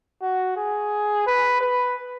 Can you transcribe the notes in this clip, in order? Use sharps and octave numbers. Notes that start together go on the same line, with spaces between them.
F#4
G#4
B4
B4